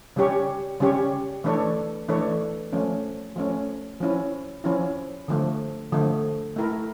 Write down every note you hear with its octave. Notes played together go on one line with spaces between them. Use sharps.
C#3 G3 C#4 G4 C#5
C#3 G3 C#4 G4 C#5
E3 A3 D4 A4 C#5
E3 A3 D4 A4 C#5
F3 A3 C#4
F3 A3 C#4
F3 C#4 E4
F3 C#4 E4
D3 F3 A3
D3 F3 A3
A3 E4 A#4